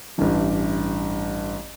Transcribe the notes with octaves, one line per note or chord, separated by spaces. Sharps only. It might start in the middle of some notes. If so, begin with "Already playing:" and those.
A1 G2 E3